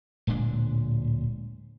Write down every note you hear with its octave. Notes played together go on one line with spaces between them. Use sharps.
D1 A#2 G#3 D4